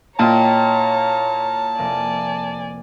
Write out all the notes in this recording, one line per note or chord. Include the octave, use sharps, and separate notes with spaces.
A#2 E4 C#5 D#5 G5 A5 A#5
F1 A#3 D5 G#5 D#7